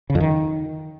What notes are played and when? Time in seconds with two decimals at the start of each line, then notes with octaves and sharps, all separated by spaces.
0.10 C#3
0.15 F2
0.20 D#3